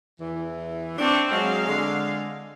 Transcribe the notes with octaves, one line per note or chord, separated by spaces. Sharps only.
E2 E3
C4 D4 C#6
F#3 G#3 F5
D3 G#3